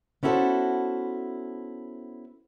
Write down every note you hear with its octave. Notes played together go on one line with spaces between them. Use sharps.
B3 C#4 E4 F#4 A4 C5